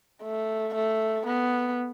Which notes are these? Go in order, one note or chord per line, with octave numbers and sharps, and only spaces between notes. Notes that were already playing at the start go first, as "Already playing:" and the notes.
A3
A3
B3